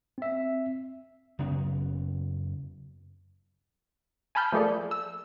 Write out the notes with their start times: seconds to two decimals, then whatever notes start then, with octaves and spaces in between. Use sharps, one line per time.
0.18 C4 E5
1.39 F#2 C#3 B3
4.35 G#5 A5 B5 F6 G6
4.52 F3 A3 A#3 G#4 A4 D5
4.91 E6